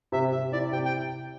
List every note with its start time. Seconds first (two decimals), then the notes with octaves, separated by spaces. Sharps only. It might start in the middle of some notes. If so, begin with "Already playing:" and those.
0.12 C3 E5
0.32 C3 E5
0.52 E4 D5
0.72 C3 G5
0.85 G5